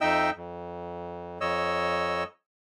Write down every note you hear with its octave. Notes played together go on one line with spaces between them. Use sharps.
F2 D#4 D#5 E5 G5 E6
F2
F2 C#5 D#5 E6